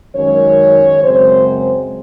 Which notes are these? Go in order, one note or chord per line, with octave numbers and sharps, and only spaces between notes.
F#2 D#3 G#3 C#4 C#5
F#2 C#3 G#3 C4 C5